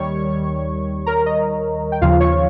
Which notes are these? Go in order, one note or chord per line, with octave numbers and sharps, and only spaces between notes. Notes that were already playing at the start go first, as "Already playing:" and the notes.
Already playing: D#2 D#3 G3 C#5 C#6
A#4 A#5
D#5
G5
D#2 C#3 F3 F4 F5
C#5 C#6